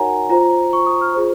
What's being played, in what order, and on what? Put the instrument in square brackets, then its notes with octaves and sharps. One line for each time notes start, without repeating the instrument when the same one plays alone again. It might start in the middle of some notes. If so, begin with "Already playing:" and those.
Already playing: [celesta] D#4 F#4 A#4 C#5 F#5 G#5 A#5
F4 C5 A#5
C#6
D#6
F6
F4 G#4 C5